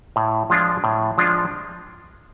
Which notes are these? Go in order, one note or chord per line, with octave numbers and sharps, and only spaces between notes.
A2
F3 G#3 D4 F4
A2
F3 G#3 D4 F4